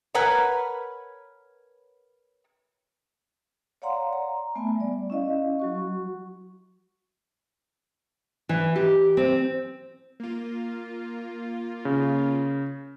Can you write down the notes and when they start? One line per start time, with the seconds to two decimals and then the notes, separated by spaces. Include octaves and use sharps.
0.15 A#4 B4 C#5 F#5 G#5 A#5
3.82 C#5 D5 F5 F#5 A#5 C6
4.13 A#5
4.55 A3 B3 E5 G#5
4.76 G3 D5
5.10 C#4 E4 D#5 F5
5.59 F#3 F#4 C#6
8.49 E3
8.76 G4
9.17 C4
10.20 A#3 F4
11.85 C#3